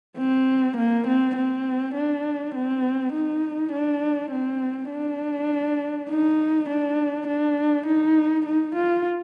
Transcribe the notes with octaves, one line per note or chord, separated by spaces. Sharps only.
C4
A#3
C4
C4
D4
C4
D#4
D4
C4
D4
D#4
D4
D4
D#4
D#4
F4